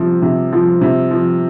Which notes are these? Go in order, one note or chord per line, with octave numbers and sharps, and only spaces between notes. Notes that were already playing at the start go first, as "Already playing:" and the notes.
Already playing: C3 F3
C3
F3
C3
F3